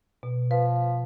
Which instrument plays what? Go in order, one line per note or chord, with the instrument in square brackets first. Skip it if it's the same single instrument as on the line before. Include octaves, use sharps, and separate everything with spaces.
[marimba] B2
[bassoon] F3 [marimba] B4